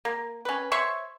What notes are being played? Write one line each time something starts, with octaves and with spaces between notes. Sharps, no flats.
A#3
C#4 B4
C5 C#5 E5 C#6